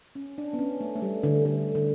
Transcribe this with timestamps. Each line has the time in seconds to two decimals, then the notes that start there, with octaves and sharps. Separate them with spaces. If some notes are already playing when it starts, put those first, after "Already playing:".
0.15 C#4
0.38 D4
0.53 B3
0.59 C#4
0.81 A3
0.96 A3
1.02 G3
1.23 D3
1.45 D3
1.75 D3